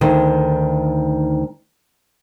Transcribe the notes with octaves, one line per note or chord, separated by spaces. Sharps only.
D2 D#3